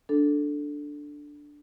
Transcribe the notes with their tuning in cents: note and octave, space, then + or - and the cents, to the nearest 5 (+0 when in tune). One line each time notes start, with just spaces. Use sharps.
D4 +0 A4 +0